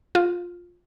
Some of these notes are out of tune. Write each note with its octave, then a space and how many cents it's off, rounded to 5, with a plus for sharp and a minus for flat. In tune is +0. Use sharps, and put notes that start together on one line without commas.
F4 +10